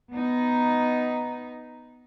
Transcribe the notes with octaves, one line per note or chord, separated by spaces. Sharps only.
B3 D#4